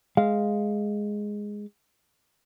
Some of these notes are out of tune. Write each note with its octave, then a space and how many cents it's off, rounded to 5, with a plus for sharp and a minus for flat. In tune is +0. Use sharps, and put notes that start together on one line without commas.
G#3 +0 F5 +0